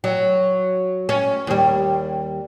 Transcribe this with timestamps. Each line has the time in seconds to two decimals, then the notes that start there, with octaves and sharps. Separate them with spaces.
0.04 F#3
1.09 C#4
1.47 D#2 G3